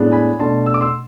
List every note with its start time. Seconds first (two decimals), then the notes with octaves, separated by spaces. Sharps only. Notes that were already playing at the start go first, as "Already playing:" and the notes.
Already playing: A2 G#3 B3 D4
0.11 G#5 B5
0.39 B2 A3 D4 A5 C6
0.66 E6
0.74 D6
0.81 C6 E6